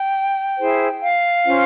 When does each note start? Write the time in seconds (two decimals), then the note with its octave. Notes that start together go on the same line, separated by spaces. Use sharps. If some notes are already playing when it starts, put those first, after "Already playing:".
Already playing: G5
0.57 E4 G#4 C5
1.01 F5
1.45 C#4 F4 C5